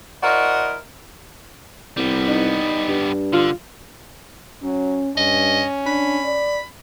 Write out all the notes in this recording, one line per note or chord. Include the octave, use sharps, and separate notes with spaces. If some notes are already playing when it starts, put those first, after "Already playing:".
E4 F#4 A#4 C5 D5 D#5
C2 G3 B3
D#4
G2
D3 F4
F#3 C#4
G2 C#4 D#5
D4 B5
D5